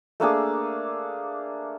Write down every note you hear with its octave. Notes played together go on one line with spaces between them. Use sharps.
A3 A#3 D4 G#4